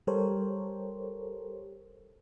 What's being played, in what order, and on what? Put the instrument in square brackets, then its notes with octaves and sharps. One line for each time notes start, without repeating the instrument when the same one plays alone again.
[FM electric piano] G3 G4 A4 A#4 C5 C#5